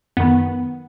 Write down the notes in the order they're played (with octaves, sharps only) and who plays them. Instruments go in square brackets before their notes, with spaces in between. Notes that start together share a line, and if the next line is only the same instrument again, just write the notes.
[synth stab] F#2 D#3 B3